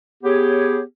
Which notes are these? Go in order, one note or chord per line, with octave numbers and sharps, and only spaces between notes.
B3 G4 G#4 C#5